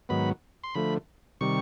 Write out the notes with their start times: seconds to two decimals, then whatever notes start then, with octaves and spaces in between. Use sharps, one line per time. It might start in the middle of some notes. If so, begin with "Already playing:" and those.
0.09 G#2 D#3 F#3 B3 B5
0.64 C6
0.75 D3 F3 A3 B5
1.41 C3 D#3 G3 C#6